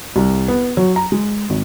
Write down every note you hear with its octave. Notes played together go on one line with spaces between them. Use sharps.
C2
B3
F#3
A#5
G#3
G#1